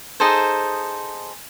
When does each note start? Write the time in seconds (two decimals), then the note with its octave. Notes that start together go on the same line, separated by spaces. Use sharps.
0.20 D#4 G#4 A4 C5